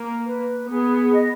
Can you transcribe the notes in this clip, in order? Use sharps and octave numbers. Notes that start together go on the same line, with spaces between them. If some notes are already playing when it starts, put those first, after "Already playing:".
Already playing: A#3
B4
B3 G#4
D#5